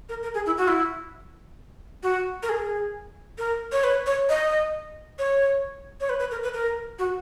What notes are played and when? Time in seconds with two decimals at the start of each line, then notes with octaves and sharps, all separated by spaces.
0.09 A#4
0.23 A#4
0.34 G#4
0.46 E4
0.58 F#4
0.68 E4
2.03 F#4
2.43 A#4
2.49 G#4
3.38 A#4
3.72 C#5
3.84 B4
4.07 C#5
4.29 D#5
5.19 C#5
6.01 C#5
6.09 B4
6.20 B4
6.31 A#4
6.43 B4
6.54 A#4
6.99 F#4